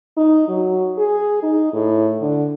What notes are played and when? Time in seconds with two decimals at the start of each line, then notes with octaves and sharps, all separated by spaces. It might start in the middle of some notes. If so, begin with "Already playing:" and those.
0.17 D#4
0.48 F#3
0.98 G#4
1.43 D#4
1.73 A2
2.22 D3